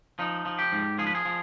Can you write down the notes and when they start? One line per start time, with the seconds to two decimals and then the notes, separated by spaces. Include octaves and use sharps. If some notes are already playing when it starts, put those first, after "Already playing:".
0.19 F3 D#4
0.46 F3
0.59 G4
0.72 G#2
0.99 F3 G#4
1.07 B4
1.15 G#4
1.25 F3